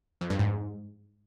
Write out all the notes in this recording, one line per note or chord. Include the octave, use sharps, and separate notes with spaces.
F2
G2
G#2